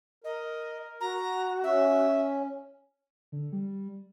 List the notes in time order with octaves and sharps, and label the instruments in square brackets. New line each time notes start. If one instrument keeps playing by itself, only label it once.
[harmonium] A#4 [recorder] D#5
[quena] F#4 [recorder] A#5
[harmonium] C#4 [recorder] E5
[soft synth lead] D3
G3